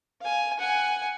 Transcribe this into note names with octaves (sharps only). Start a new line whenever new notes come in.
F5 G#5
F#5 G#5